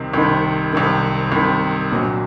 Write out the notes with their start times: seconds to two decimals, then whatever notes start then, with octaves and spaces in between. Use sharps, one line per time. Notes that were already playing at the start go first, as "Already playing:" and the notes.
Already playing: C2 C3 D#3
0.13 C2 C3 D#3
0.73 C2 C3 D#3
1.32 C2 C3 D#3
1.91 A#1 A#2 F#3